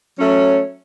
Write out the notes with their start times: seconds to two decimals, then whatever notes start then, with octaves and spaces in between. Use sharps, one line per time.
0.19 F#3 A3 C#4